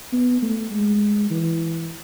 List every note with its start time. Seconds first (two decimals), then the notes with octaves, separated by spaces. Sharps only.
0.13 B3
0.42 A3
0.71 G#3
1.30 E3